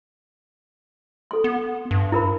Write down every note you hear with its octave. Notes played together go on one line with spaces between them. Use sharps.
A4 C6
B3
G2
E4 A#4 B5